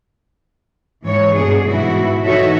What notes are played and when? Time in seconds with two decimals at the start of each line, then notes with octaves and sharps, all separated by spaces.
1.04 G#2 E3 C#5
1.35 G2 B2 D4 G#4
1.68 G#2 B2 E3 E4 F#4
2.24 E3 D#4 F#4 A4 C#5 E5